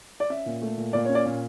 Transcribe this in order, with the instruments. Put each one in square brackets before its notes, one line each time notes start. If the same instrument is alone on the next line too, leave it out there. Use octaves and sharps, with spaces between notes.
[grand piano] D5
C#4 E5
A#2
A3
A#2
A#2 D5
C#4 C#5
D5
A#2